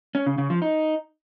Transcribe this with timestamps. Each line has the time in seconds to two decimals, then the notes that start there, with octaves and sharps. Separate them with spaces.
0.15 C#4
0.27 C#3
0.38 C#3
0.50 F3
0.62 D#4